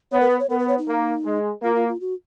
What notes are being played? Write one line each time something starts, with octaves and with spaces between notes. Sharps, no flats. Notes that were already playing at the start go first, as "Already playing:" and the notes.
B3 C#5
A#4
B4
C#5
B3 A#4
B4
C#5
D#4
A#3
G#3
A#3 F4
F4
F4
F#4